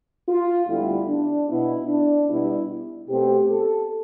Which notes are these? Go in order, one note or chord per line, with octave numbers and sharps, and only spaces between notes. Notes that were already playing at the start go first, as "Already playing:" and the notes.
F4
D2 D3 G3 B3 E4
D4
B2 B3 E4
D4
B2 G3 B3 E4
B2 A3 C4 G4
A4